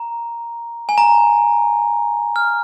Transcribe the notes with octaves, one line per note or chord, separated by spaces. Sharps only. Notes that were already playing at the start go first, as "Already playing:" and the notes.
Already playing: A#5
G#5
A#5
F6